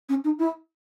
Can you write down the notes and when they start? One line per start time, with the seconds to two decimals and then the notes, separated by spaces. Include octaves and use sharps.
0.09 C#4
0.24 D#4
0.39 E4